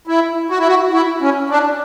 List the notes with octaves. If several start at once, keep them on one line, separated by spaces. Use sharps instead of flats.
E4
F#4
E4
F#4
E4
C#4
D4